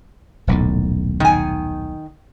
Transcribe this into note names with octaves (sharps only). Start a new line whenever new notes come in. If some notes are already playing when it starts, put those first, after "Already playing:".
D#1 B1 A2
D#3 G#5